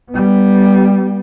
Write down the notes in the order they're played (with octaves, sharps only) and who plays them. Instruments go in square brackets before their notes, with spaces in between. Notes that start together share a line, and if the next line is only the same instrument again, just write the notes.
[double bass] G3 B3